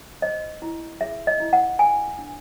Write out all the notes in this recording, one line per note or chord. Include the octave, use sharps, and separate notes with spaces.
C5 D#5
E4
G#4 E5
D#5
E4
F#5
A4 G#5
D4